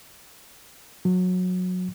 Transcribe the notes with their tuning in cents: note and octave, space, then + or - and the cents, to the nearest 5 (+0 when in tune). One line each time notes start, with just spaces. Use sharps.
F#3 -20